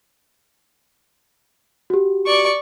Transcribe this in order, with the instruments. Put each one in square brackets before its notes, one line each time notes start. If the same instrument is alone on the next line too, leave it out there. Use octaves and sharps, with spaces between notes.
[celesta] F#4 G4
[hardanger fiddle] D5 C#6